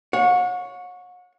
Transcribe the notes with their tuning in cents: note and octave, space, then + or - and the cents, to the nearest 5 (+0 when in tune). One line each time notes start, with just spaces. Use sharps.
C#5 +0 F#5 -40